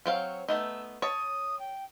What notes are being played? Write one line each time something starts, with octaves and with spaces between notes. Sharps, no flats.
F#3 C4 C#5 F5
A3 B3 D#4 E6
C#5 A5 D#6
G5